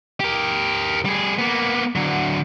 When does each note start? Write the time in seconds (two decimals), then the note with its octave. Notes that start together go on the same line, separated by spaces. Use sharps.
0.20 G4 A#4
1.05 G3 G#4
1.38 A#3 B3
1.96 D3 F#3